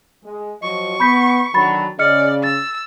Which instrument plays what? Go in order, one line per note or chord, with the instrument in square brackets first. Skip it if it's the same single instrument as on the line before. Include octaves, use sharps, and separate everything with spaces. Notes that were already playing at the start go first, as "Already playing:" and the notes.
[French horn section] G#3
[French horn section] F3 F#3 D#5 [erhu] C#6
[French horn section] B3 [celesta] B5 G6 B6
[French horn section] D3 D#3 F#3 [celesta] B5 A6
[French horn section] C#3 [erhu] D5 [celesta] D#5 F6 C#7
[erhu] E6 [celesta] A6